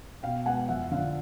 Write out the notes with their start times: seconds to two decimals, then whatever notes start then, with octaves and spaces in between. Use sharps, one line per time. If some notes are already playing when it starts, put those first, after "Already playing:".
0.23 B2 F5 G5
0.46 G#3 B3 F#5 G#5
0.68 F2 E5 F#5
0.92 D3 F3 F5